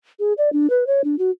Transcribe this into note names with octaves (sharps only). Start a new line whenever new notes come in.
G#4
D5
D4
B4
C#5
D4
F#4